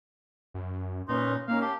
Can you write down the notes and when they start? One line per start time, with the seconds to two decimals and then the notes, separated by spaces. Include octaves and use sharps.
0.54 F#2
1.09 A#2 C#4 D#4 B4 C6
1.48 A#3 C#4 D#4 F5 A#5
1.62 G4 A5